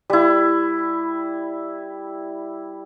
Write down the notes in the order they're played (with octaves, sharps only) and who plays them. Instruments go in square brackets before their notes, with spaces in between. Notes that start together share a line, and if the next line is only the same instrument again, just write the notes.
[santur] G3 E4